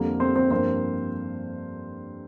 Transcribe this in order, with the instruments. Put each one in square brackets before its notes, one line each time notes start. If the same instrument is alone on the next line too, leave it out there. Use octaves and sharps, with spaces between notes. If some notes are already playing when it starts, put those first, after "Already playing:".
Already playing: [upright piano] F2 D3 G3 A#3 C4 A#4
C4 C5
C4 C5
G2 F3 A#3 C4 C5